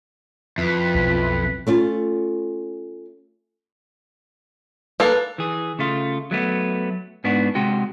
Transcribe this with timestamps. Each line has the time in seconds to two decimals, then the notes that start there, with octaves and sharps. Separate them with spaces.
0.58 F2 E4 F4 B4
0.95 B1
1.67 A3 C#4 F4
5.00 A#3 A4 B4
5.38 E3 G#4
5.79 C#3 A3 F4
6.31 F#3 A3 B3
7.24 G#2 B3 D4 F#4
7.55 C3 G#3 F#4 G5